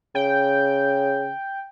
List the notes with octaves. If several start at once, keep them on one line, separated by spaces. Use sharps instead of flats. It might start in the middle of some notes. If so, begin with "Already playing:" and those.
C#3 G5